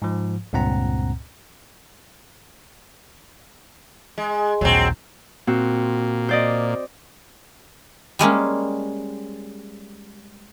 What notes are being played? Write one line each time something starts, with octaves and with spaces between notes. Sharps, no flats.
G#2 F3
C#2 G2 A#2 C4 F#5 A#5
G#3
A#1 D#2 F#3 C4
A#2 C4 F#4
C5 D5 D#5
G3 G#3 A#3 C#4